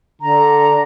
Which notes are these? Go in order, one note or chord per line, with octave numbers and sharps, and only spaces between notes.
D3 A#5